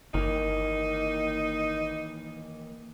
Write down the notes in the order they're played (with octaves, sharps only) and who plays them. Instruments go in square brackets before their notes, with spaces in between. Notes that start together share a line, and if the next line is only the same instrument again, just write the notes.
[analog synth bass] G1 [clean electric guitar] D#3 E3 A#3 [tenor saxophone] D#4